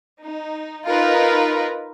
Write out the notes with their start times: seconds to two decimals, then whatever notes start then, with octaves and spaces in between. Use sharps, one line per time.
0.22 D#4
0.87 D#4 F4 A#4 B4